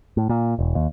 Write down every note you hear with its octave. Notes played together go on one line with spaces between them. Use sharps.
A2
A#2
E1
D#2